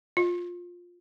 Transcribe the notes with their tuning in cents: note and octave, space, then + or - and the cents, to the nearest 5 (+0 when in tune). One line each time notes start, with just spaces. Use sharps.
F4 +15